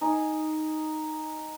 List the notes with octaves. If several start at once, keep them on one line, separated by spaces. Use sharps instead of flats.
D#4 G#5 D#6